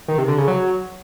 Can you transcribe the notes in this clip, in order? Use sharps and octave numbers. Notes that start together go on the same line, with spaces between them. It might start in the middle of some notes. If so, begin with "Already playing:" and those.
D#3
C3
D3
C#3
F#3